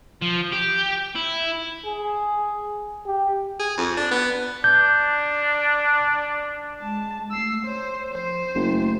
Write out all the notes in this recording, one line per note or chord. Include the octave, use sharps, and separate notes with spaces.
F3
G4
E4
G#4
G4
G#4
F2
D4
B3
D4 G6
G#3 A5
A3 E6 C7
C5 C#5
F3 C5
F#1 A3